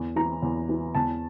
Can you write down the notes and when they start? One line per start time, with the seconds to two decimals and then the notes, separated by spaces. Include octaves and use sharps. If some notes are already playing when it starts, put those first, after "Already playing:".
Already playing: E2
0.16 E3 A#5
0.42 E2
0.69 E3
0.95 E2 A5